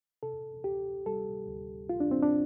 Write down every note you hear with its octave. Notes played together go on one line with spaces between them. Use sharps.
C3 A4
D2 G4
G3 A4
D2
D2 F4
D4
C4
D4